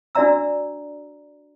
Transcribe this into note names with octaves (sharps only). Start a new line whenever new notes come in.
D4 F#4 D5 E5 A#5 E6